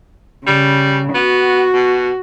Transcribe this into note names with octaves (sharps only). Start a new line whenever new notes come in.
C#3 G3
B3 F#4
B2